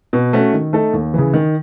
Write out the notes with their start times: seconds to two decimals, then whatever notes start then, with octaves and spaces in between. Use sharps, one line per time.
0.13 B2
0.33 A3 C#4 F#4
0.53 D#3
0.73 A3 D#4 A4
0.93 D#2
1.14 C#3 E3
1.34 D#3